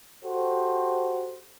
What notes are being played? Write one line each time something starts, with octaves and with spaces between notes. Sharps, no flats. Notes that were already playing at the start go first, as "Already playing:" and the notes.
F#4 G4 A4 C5